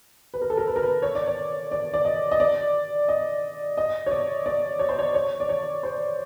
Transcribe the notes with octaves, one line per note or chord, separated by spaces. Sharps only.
B4
A#4
A4
A#4
B4
A#4
B4
C#5
D5
C#5
D5
D5
D#5
D#5
D5
D#5
D#5
C#5
D5
D5
C#5
C5
C#5
C#5
D5
C#5
C5